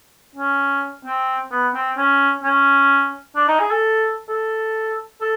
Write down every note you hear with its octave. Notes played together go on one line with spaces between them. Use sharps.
C#4
C4
B3
C4
C#4
C#4
D4
D#4
G#4
A4
A4
A4